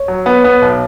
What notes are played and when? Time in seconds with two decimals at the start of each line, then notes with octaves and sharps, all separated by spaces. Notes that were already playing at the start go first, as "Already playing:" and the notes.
Already playing: C#5
0.08 F#3
0.26 B3
0.44 B3
0.62 B1